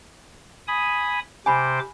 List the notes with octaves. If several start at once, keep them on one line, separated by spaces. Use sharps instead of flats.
G#5 B5 D#6
C3 C5 G#5 B5 D6